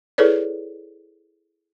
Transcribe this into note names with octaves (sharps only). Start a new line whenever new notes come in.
E4 G#4 A4 B4 C#5 D5